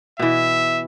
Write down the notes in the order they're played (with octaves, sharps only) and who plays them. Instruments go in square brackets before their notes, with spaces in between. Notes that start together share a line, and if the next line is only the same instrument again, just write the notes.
[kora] B2 E3 [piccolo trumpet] E5